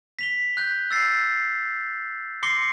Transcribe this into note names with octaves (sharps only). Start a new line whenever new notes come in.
B6 F7 G7
F#6 G6
E6 A6 C7
C6 D6 A#6 C7 C#7 G7